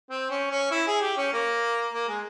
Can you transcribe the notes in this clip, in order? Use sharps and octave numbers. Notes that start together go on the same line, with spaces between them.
C4
C#4
C#4
E4
G#4
G4
C#4
A#3
A#3
G#3